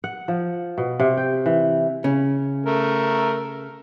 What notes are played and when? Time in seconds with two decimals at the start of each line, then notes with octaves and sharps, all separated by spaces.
0.04 F#5
0.28 F3
0.78 B2
1.00 C3
1.17 G5
1.46 E3
2.04 C#3
2.66 A3 A#4